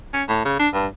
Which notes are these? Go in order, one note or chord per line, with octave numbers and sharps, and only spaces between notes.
C#4
A2
C#3
D4
G2